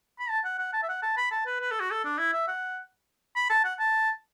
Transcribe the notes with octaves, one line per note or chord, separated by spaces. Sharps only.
B5
A5
F#5
F#5
A5
E5
F#5
A5
B5
A5
B4
B4
A4
F#4
A4
D4
E4
E5
F#5
B5
A5
F#5
A5